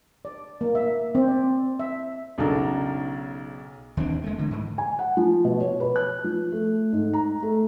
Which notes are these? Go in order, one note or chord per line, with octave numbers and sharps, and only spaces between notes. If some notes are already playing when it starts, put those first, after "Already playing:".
D5
A#3
E5
C4
D5
E5
B1 C#3 D4 D#4 A4 A#5
D#2 E3 C4 D4
G#3 A3
D3 E3
G#2
G#5
F#5
F3
B2
C#5
B4
F#6
F3
A3
G#2
A#5
A3